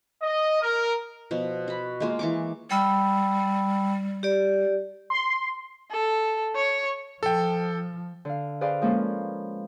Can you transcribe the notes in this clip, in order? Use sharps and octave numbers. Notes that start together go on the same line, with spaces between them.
D#5
A#4
B2 F3
F#4 B5
G#3 A#3 F4
E3 C#6 D6
G3 G5 B5 E6
G4 D5
C6
A4
C#5
F3 A4 G5
D3 F5
G#4 B4 C5 D5 F5
F3 G#3 A#3 C#4 A4 B4